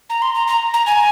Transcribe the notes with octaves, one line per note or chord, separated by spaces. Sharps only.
A#5
C6
A#5
A#5
A#5
G#5